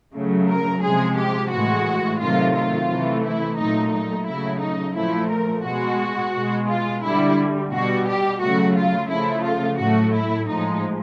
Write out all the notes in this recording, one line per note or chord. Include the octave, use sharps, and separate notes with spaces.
C#3 F#3 A3
A#4
C3 F3 G#3 G#4
G4
A2 E3 G#3 F#4
C3 D#3 F#3 A3 F4
F4
C3 E3 A3
E4
A#2 F#3 A3 D#4
D#4
C#3 F#3 A3 E4
D#4
A#2 F3 A3 E4
A#4
B2 G#3 F#4
B2 G#3
F4
D3 G3 E4
B2 G3 F#4
G4
C#3 F#3 A3 F#4
F4
C#3 F3 A3 E4
F4
A2 F#3 A3 F#4
E4
A2 F3 G#3 D#4